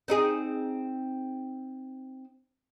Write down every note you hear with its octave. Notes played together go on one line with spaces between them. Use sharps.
C4 D#4 G#4